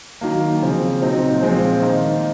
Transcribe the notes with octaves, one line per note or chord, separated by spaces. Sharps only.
D#3 F#3 A#3
C#3 F3 C4
A#2 F#3 C4 D#4
A#2 F3 G#3 C4
D#3 A#3 D#4